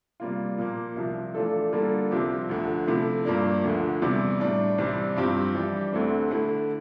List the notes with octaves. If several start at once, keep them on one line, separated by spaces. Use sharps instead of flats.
C3 G3 A#3 F4
A#2 F3 A#3
C2 C3 F3
E3 A3 D4 F4 A4
D3 G3 A#3 F4 A4
C2 C3 F3 C4 G4
D2 D3 F3
C3 F3 A3 E4
G2 F3 A#3 D4
D2 D3 F3
E2 C3 E3 G3
A2 G3 D4
C2 C3 E3 G3 C4
G2 F3 C4 G4
E3 G3 D4 G4
D2 D3 A3 C4
D3 A3 E4